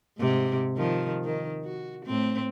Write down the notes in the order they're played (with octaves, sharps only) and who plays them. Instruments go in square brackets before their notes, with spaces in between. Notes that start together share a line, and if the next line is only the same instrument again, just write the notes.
[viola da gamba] G#2 C3
D#3 F3
D#3
F#4
A2 C4